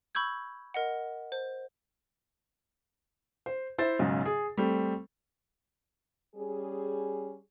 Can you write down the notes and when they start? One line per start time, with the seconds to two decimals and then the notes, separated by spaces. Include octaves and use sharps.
0.15 B5 C#6 E6 G6 G#6
0.74 A#4 D#5 F#5
1.32 C5
3.46 C5
3.78 E4 C5 E5 A6
3.99 B1 G#2 C#3
4.25 G#4
4.57 G3 A3 C4
6.35 G3 C#4 G#4